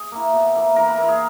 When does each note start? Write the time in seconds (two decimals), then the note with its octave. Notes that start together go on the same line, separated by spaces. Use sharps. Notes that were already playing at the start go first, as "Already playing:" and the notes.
Already playing: G#4
0.12 A#3 E4
0.33 B2
0.55 A#3 E4
0.76 E3 A#4
0.88 B4
0.98 A#3 E4 A#4
1.08 G#4